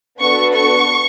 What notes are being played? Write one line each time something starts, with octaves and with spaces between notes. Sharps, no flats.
B3 D4 F#4 A4 C#6
C#6